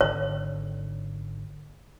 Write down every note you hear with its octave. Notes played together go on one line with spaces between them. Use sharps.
G#1 D3 C#5